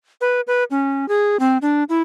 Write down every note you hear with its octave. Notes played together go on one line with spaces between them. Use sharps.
B4
B4
C#4
G#4
C4
D4
E4